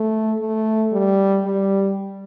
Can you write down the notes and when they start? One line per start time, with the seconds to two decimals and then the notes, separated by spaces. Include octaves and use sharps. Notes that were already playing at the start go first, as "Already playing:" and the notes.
Already playing: A3
0.40 A3
0.92 G3
1.45 G3